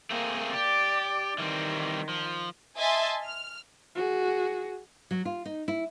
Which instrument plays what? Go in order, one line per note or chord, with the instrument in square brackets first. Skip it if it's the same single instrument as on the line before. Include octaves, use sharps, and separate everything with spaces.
[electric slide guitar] A3 C4 G#4 [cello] A#3
[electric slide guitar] G4 [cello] D5
[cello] D#3 [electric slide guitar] E3 G3 C4
[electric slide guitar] F3
[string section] D#5 E5 G#5 A5 C6 A6
F6
[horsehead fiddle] F#4 G#4
[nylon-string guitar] F#3
F4
D#4
E4